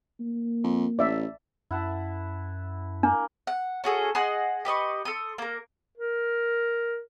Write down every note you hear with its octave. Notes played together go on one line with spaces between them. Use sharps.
A#3
F2
A1 D5 E5
F#2 E4 F#5 A5
A#3 D4
F#5
C#4 F#4 G#4 A4
G#4 D#5 F#5 C6
G4 B4 D#5 C#6
A4 C6 D#6
A#3 A#4
A#4